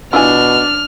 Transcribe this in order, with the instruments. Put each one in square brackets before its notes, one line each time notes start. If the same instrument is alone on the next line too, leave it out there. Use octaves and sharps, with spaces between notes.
[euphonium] B2 [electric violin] D4 [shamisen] E4 F4 G#5 [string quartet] F6